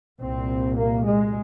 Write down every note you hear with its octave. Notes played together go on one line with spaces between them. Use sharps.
C2 A#2 C4
A#3
G#3